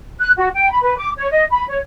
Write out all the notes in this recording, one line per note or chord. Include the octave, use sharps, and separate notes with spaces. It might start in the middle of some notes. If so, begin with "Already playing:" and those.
F#6
F#4
G5
B5
B4
D6
C#5
D#5
B5
C#5